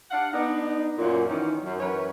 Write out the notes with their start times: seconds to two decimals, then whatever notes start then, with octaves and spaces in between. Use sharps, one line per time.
0.11 D4 G4 F5 F#5
0.33 B3 D4 D#4
0.98 F#2 A#2
1.28 D#3 E3 C#4
1.62 F#2
1.80 F#2 E3 C#4 A#4 B4 C#5